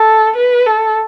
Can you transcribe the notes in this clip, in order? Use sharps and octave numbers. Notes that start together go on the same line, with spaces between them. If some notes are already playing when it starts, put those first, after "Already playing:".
Already playing: A4
B4
A4